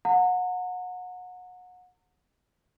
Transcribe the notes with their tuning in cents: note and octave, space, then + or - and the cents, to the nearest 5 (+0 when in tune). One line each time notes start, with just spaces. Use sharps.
F#5 -30 A#5 -35